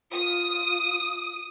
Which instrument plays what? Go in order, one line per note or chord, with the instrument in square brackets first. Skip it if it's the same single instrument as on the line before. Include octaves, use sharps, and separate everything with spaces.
[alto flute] F4 [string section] D#6